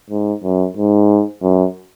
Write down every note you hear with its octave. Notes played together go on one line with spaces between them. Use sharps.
G#2
F#2
G#2
F#2